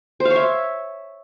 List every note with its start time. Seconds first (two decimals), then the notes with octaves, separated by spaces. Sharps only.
0.20 C5
0.25 F5
0.30 C#5
0.36 E5